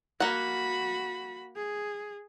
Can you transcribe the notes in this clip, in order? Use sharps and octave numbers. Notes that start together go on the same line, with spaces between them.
A#3 F#4 F#5 B5
G#4